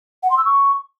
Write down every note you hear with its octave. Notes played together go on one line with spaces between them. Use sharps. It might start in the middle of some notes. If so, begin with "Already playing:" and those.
F#5
C6
E6
C#6